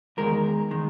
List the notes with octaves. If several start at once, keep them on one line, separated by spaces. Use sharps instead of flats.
E2 D#3 G#3 A#4
D#3 G#3